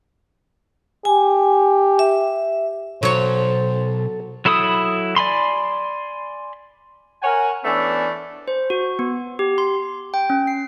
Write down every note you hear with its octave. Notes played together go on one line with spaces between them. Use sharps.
G4 G#5
E5
B1 F#3 A4 C5 C#5
F#3 E4 A4 B5 D#6
D5 G#5 B5 C6
A#4 C#5 F#5 G#5
E3 A3 B3 C#4 D4
C5
F#4
B3
G4
C6
G5
C#4
C7